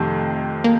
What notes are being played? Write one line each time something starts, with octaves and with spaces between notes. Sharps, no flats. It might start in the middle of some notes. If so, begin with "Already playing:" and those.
Already playing: F2 C3 D#3 A3
A#3